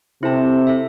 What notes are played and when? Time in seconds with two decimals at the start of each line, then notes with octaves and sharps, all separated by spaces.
0.23 C3 E4 A4 C5 A5
0.67 E4 A4 E5